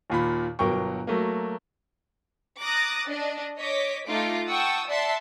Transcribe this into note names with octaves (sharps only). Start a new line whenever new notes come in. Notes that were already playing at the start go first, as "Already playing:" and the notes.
D#2 A#2 B5
G1 B2 F#3 A#4 G5 C#6
F#3 A3 A#3
A#5 D6 D#6 F#6 A6 A#6
D4 D#5
C#5 D#5 D6 B6
A3 D#4 F4 D6
F#5 G5 A5 C#6 D#6 E6
D5 E5 F#5 A5 C6